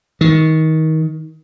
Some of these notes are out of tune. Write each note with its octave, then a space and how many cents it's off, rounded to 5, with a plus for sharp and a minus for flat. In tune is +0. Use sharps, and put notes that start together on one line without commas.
D#3 +25